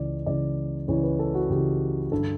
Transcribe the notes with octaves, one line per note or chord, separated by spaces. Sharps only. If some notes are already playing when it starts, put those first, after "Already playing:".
Already playing: C#2 C#3 E3 D5
C#2 C#3 E3 D5
C#2 C#3 E3 C#5
B4
A4
F#4
C#2 C#3 E3 G4
G2 D3 A4